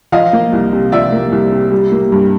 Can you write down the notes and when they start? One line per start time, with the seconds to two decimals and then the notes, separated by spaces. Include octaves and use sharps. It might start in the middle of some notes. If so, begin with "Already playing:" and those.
0.12 F3 D#5 F5
0.33 A#3
0.53 C2
0.73 C3
0.92 F3 D5 E5
1.12 A#3
1.32 C2
1.52 C3
1.72 G3
1.92 A#3
2.12 G2